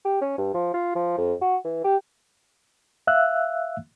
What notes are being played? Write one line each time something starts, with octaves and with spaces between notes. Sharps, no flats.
G4
C#4
G2
F3
F4
F3
F2
F#4
E3
G4
E5 F5 E6 F#6